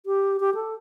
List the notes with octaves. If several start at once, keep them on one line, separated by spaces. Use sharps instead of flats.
G4
G4
A4